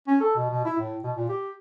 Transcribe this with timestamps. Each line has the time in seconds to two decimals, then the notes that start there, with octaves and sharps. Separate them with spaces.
0.07 C#4
0.21 A4
0.35 B2
0.50 B2
0.65 E4
0.78 A2
1.03 B2
1.16 A#2
1.29 G4